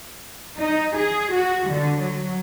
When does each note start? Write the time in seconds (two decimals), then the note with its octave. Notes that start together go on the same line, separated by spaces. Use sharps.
0.58 D#4
0.96 G#4
1.31 F#4
1.69 D3
1.99 F#3